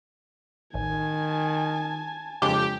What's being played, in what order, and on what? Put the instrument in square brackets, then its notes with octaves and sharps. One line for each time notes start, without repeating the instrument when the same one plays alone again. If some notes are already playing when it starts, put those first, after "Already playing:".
[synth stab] A1 [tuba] D#3 [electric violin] G#5 A5
[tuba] F2 [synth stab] C#3 G#3 D4 [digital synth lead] G4